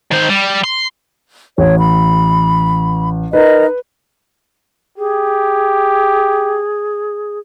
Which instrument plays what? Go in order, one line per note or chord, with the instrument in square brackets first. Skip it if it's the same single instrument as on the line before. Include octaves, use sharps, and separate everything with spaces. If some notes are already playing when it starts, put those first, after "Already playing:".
[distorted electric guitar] D#3 C5
G3
C6
[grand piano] A1 [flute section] C#5
[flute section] B5
[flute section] D#4 A#4 D#5 [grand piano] B4
[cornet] G4 [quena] G#4